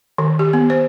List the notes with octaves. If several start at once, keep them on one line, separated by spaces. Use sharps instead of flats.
D#3
G4
B3
C5